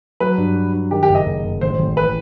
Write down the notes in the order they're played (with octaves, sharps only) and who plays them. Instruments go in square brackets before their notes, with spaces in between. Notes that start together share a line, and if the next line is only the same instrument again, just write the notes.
[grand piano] F#3 [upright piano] B4
[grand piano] G2
F#4
G2
[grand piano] D#3 [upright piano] G4
[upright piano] G4
[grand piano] F#1
[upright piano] D#5
[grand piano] F#1
F#1
[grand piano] A1 [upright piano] C5
[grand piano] A1
[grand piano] E3 [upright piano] B4